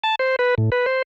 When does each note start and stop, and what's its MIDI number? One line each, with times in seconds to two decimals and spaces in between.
0.04 0.15 81
0.19 0.36 72
0.39 0.55 71
0.58 0.70 45
0.72 0.86 71
0.86 1.02 72